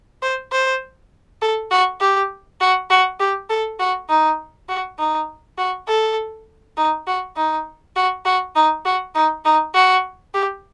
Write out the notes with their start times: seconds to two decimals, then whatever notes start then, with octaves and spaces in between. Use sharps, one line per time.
0.22 C5
0.52 C5
1.42 A4
1.71 F#4
2.01 G4
2.60 F#4
2.90 F#4
3.20 G4
3.50 A4
3.79 F#4
4.09 D#4
4.69 F#4
4.99 D#4
5.58 F#4
5.88 A4
6.77 D#4
7.07 F#4
7.37 D#4
7.96 F#4
8.25 F#4
8.56 D#4
8.85 F#4
9.15 D#4
9.45 D#4
9.74 F#4
10.34 G4